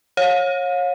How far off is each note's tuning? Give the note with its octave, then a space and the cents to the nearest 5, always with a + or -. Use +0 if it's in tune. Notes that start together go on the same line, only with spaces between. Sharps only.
C#5 -20 F5 +40